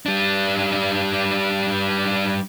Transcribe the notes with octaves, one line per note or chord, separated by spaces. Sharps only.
G3 D4